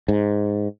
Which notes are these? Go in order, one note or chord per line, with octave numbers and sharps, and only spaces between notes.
G#2